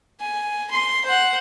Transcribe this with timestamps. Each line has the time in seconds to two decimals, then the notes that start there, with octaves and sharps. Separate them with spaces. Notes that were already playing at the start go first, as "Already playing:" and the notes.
0.20 G#5
0.71 C6
1.05 C5 F#5